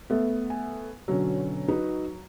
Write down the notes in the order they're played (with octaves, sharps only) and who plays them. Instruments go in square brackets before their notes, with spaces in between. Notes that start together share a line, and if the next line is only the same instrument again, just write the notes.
[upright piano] A3 B3
[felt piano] G#5
[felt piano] B2 D3 C#4 [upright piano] F#3
[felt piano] D#4 F#4 B4